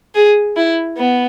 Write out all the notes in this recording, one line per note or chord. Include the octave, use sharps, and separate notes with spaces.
G#4
E4
B3